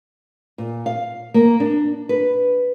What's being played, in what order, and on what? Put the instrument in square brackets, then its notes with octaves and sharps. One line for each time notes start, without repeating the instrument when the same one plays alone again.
[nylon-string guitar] A#2
F5
A#3
D4
B4